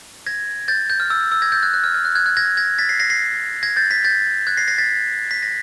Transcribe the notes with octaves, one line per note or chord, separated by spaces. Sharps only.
G#6 A#6
G6 A6
G6
F6
E6
E6
E6
G#6 A#6
G6 A6
F#6 G#6
F#6
F6
F6
F#6
F#6 G#6
F#6 G#6
G#6 A#6
G#6 A#6
A6 B6
A#6 C7
A#6 C7
A#6 C7
G#6 A#6
G6 A6
A6 B6
G6 A6
F#6 G#6
A#6 C7
A#6 C7
A6 B6
B6
A#6